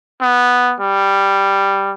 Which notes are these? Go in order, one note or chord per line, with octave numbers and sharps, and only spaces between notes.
B3
G3